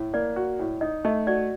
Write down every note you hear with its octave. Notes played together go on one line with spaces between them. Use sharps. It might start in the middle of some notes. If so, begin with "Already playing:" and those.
Already playing: A2
A#3 D5
F#4
A2
D#4 D#5
A3 D#5
F#4 D5